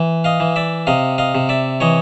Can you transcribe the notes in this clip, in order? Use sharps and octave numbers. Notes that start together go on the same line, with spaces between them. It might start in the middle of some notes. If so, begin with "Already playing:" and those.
Already playing: E3
D#5 F5
E3
D5 E5
C3 D#5 F5
D#5 F5
C3
D5 E5
E3 C#5 D#5